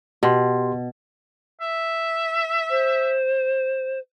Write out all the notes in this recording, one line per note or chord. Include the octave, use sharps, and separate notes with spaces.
B2 G4 C6
E5
C5